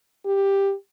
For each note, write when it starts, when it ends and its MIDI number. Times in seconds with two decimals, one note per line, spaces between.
0.25 0.73 67